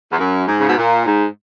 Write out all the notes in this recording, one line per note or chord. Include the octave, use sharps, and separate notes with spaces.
E2
F#2
G#2
C#3
B2
A#2
G#2